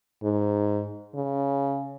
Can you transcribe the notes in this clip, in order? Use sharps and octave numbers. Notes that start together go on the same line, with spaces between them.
G#2
C#3